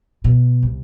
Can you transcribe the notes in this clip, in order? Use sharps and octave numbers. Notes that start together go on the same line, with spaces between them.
B2
C2